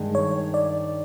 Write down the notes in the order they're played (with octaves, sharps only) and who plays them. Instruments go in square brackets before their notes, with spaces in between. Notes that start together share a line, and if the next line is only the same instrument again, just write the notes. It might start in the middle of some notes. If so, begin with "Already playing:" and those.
Already playing: [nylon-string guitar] G2 D#3 G#3
[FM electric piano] C#5
D5